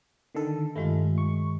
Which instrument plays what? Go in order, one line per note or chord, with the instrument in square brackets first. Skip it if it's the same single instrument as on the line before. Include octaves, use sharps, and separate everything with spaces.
[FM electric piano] D3 D#3 A4
[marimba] G2 D#3 G#3 [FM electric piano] A3 F4
[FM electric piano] C#6